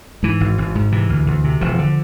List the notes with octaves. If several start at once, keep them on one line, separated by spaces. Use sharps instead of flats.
G#2 E3
G#1
G#1
G#2
C3 E3
D2
D2
C3
E1 F3
D3